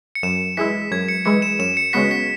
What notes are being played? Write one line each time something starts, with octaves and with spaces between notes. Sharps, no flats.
C#7
F#2 E7
E3 G#3 E4 B6
F#2 G#6
C#7
E3 G#3 E4 C#7
E7
F#2 E7
C#7
C#3 G#3 B3 F#4 B6
B6